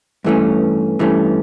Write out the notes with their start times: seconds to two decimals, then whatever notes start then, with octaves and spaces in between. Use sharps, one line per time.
0.24 G2 E3 A3 C#4
0.99 G2 E3 A3 C#4